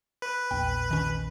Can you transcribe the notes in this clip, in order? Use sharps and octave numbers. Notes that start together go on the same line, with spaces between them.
B4
A#1 E2 G5
D#3 C#4